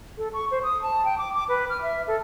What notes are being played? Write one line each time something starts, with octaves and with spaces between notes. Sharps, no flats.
A4
C#6
C5
D#6
A5
G5
D6
D6
B4
F6
E5
A4